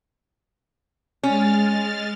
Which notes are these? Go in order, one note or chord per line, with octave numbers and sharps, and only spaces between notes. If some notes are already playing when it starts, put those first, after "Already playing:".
G#3 C#4 F6 A6